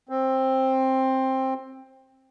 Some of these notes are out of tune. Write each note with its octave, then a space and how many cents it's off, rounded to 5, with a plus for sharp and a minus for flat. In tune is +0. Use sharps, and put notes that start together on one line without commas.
C4 +10